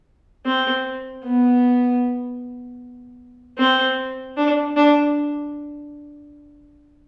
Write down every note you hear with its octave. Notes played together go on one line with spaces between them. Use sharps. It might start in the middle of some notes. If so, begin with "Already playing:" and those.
C4
B3
C4
D4
D4